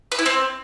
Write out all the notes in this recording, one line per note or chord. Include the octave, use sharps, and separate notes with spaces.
B4
E4
C4